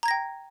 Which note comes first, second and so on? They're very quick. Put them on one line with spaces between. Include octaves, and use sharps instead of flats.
A#5 G#6 A#6 G5